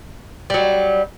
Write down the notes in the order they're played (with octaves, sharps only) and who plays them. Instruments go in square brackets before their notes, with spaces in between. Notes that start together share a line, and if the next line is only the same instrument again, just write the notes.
[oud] F#3 G3